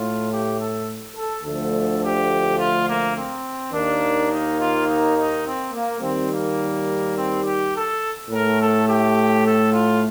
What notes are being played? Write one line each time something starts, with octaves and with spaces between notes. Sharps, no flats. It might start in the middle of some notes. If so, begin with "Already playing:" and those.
Already playing: A2 A3 F4
G4
A4
A4
D2 D3 F3 A3 A4
G4
F4
A#3
C4
D#2 D#3 A#3 D4
D#4
F4
D#4
D#4
C4
A#3
D#2 D#3 G3 C4
A#3
C4
G4
A4
A2 A3 A#4
A4
G4
A4
F4